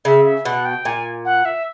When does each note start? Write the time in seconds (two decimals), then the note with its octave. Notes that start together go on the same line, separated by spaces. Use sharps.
0.05 C#3 E5
0.25 E5
0.45 B2 F#5
0.65 G5
0.85 A#2 G#5
1.25 F#5
1.45 E5